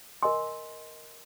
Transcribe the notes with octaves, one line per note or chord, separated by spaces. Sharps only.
A#4 D#5 G#5 C6